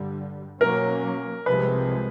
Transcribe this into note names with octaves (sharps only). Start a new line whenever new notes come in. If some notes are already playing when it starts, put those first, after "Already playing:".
Already playing: G2 D3 G3
B2 F#3 A#3 C#4 A#4
C2 C3 F3 G#3 B4